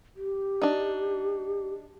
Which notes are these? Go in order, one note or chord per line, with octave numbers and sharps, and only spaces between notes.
G4
D4 D#4